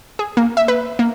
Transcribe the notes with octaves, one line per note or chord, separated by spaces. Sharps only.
G#4
A#3
E5
B4
A#3